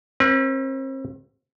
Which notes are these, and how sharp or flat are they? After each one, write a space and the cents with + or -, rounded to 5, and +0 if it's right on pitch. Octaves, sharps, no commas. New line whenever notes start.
C4 +40 B4 -40